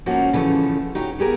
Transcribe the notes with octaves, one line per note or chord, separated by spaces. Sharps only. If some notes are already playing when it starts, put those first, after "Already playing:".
G#2 F3 A#3 C#4 D#4 F#4
C#3 E3 F3 A3
D#4 F#4 G4 C#5
B3 G4 G#4 A#4